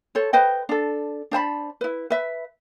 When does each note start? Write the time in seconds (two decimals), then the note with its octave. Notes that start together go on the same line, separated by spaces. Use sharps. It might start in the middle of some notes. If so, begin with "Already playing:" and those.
0.15 A4 C5 C#5
0.33 B4 C5 D#5 G5
0.69 D4 A4
1.31 D4 C5 A5 B5
1.81 E4 B4
2.10 B4 E5